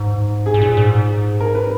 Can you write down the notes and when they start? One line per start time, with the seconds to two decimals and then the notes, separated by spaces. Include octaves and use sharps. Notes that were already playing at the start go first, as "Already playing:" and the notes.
Already playing: G#2
0.46 G#4
0.54 G#2
0.62 A#2
0.77 G#2
1.40 A#4
1.55 B4